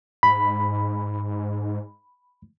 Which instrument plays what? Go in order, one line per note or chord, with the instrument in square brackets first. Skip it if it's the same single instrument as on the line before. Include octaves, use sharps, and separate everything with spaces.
[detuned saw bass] G#2 [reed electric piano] B5